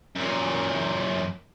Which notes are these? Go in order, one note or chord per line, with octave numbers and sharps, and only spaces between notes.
F#2 A#2